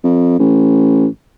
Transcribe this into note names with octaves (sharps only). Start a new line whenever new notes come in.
F2
A1